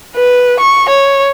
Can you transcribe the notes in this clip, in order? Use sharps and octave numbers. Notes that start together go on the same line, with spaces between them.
B4
C#6
C#5